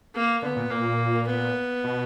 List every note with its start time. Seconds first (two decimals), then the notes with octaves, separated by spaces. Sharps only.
0.14 A#3
0.42 D3 B3
0.56 A#2
0.70 A#2 A#3
1.27 B3
1.84 B2